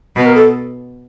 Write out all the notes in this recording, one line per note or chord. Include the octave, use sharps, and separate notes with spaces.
B2 B4
A#4
A4